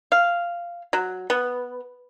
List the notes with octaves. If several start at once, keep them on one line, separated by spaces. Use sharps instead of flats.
F5
F#3
B3